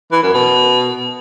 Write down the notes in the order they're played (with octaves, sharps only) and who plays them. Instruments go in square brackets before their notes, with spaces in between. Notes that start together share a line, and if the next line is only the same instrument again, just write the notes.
[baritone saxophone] E3
F#2
B2